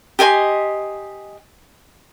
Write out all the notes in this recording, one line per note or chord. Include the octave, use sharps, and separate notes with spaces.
G4 D#5 G#5 C6